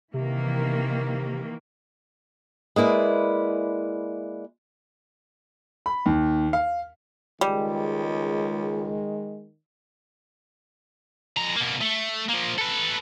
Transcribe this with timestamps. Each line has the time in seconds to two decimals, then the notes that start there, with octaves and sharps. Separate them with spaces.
0.14 C3 D#3 E3 A#3
2.76 G#3 A#3 E4 B4 D5
5.86 B5
6.06 D#2
6.53 F5
7.41 C#2 D#3 G3 G#3
11.37 F2 A#5
11.57 B2 A#3
11.81 A3
12.29 F3 A#3
12.58 A4 B4